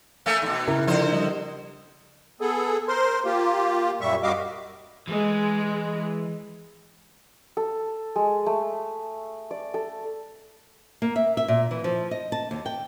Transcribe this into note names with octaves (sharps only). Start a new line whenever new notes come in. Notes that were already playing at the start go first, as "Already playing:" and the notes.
A3 A#3 C#4
D#2 B2
C#3 E4 A#4
D3 F3 C5
G3 D#5
B3 G#4 A4
A#4 C5 C6
A#3 F4 G4
F#2 A#2 G3 E5 C#6
F#2 G3 F#4 D#5 F5 D6
E3 G#3
A4
G#3
A3
D5
A4
A#3
E5
E5
A#2
E3
F3
D#5
A5
D#2
G5